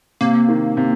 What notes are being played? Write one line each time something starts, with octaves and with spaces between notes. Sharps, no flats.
C3 A#3
D#3
C3